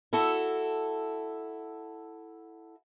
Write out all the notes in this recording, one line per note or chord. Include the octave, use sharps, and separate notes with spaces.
E4 F#4 A4